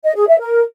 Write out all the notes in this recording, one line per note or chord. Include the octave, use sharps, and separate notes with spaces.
D#5
G#4
E5
A#4